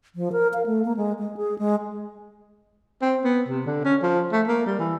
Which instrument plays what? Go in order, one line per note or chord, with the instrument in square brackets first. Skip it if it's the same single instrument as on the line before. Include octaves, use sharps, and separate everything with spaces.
[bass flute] F3
A#4
F5
A3
A#3
G#3
G#3
G#4
G#3
[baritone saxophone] C4
B3
C3
D3
C#4
F3
A3
A#3
G3
E3